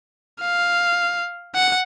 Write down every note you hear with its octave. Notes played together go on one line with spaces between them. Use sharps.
F5
F#5